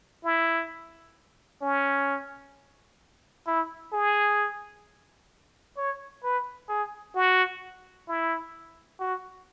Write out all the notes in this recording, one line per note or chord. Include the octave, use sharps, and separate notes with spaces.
E4
C#4
E4
G#4
C#5
B4
G#4
F#4
E4
F#4